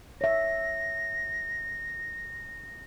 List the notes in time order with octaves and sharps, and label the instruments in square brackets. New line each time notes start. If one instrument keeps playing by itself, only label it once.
[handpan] C#5 E5 [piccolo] A#6